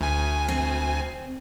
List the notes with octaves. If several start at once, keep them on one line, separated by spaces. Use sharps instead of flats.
D2 G#5
C4